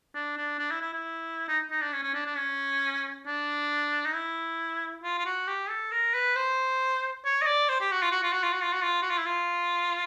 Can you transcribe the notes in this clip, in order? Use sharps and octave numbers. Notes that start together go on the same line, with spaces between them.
D4
D4
D4
E4
E4
E4
D#4
D#4
D4
C#4
C#4
D4
D4
C#4
D4
D#4
E4
F4
F4
F#4
G4
A4
A#4
B4
C5
C#5
D#5
D5
C5
G4
F#4
F4
F#4
F4
F#4
F4
F#4
F4
F#4
F4
F#4
F4
E4
F4